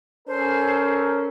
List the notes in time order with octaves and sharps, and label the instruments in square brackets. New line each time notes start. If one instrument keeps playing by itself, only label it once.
[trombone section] C#4 A4 A#4 [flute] C5